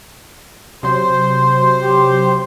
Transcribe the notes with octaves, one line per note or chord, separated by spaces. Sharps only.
C3 F#3 C5 C6
G4